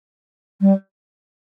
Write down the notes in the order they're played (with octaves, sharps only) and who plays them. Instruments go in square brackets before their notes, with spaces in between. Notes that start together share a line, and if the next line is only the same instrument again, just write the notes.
[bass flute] G3